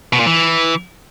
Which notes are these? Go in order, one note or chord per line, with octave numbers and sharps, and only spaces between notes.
B2
A#2
E3